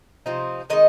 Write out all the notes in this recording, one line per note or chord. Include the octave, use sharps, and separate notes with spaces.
C3 F3 C4 D#4
D#3 G#3 D#4 D#5